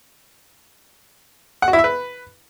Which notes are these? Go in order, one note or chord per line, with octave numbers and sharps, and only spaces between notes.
F#5
F#4
E4
E5
B4